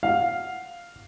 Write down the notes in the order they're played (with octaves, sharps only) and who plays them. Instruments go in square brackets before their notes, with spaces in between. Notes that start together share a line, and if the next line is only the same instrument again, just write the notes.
[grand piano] F5 F#5